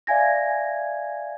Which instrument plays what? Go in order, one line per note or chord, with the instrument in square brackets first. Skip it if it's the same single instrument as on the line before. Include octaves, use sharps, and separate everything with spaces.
[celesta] D5 E5 F5 G#5 G#6 A#6